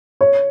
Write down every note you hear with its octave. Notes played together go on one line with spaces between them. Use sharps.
C#5